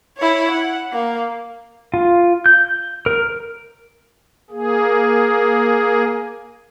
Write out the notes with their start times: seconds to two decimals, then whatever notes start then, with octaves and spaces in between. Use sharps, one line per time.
0.17 E4 C#5
0.50 F#5
0.92 A#3
1.94 F4
2.46 G6
3.06 A#4
4.50 A#3 G#4